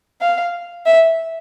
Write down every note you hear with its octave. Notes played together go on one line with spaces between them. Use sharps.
F5
E5